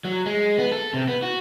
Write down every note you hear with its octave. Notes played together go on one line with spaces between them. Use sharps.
F#3
G#3
B3
A4
C3
B3
F#4